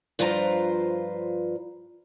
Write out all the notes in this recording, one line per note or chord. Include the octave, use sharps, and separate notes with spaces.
G2 F3 F4 B4 C5 A#5